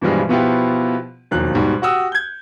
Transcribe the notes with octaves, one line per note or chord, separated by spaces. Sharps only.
G2 B2 E3 F3 G3 G#3
B2 F3 B3 E4 F4 G4
E1 D#2 F3 F#3 F#6
G#2 B2 G3
F#4 G4 F#5 D#6 E6
G6 G#6